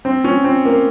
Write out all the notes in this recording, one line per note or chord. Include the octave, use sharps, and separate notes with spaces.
C4
C#4
C4
A#3